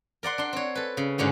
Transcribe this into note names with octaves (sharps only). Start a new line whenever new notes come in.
A#4 D5 F#5 C6
D4 C6
C4 C#5
A4 B4
C#3
G#2 D3 C#4 F#4